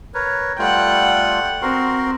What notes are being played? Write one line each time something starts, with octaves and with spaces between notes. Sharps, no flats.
A#4 B4 C#5
G3 A3 F4 F#5 G5
C4 F#4 A#4 C6